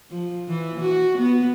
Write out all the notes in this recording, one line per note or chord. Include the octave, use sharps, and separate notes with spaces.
F3
E3
F#4
B3